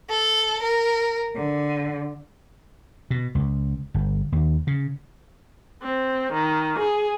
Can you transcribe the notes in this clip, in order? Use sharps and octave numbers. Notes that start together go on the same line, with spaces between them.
A4
A#4
D3
B2
C#2
G1
D#2
C#3
C4
D#3
G#4